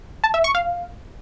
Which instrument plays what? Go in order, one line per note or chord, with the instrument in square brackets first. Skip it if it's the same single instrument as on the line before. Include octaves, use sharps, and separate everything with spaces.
[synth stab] A5
E5
C#6
F5